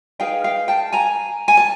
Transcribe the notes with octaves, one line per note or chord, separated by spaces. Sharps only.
D#4 G#4 B4 F5 G5
F5 G5
G5 A5
G#5 A#5
G#5
A5